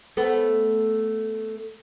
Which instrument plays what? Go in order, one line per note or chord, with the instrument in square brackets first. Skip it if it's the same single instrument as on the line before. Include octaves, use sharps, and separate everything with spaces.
[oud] A3 B3